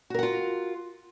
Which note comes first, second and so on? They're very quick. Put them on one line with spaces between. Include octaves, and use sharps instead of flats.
F#4 A#4 F#5 F4